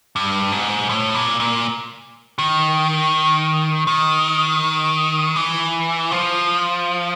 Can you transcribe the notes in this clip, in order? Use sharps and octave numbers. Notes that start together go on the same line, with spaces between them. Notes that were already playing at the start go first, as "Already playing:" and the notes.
G2
G#2
A2
A#2
A#2
D#3
D#3
E3
F3